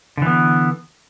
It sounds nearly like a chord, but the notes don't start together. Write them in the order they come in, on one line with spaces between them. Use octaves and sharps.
D3 E3 B3